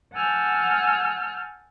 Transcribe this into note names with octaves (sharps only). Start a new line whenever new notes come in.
F#5 G#5 A5 E6 F6 G6